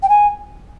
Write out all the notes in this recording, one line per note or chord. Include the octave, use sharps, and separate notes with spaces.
G5
G#5